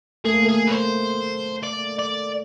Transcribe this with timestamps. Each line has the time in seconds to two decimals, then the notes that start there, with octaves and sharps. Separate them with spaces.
0.25 A3 G#4
0.34 A#3
0.42 A3
0.48 G#4
0.67 B4
0.71 C5
1.64 D5
1.99 D5